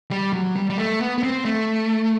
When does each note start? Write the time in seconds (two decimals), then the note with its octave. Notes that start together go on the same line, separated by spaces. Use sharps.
0.11 G3
0.33 F#3
0.56 G3
0.70 G3
0.78 A3
1.00 B3
1.18 B3
1.23 C4
1.45 A3